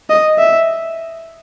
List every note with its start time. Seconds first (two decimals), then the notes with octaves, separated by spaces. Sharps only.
0.10 D#5
0.38 E5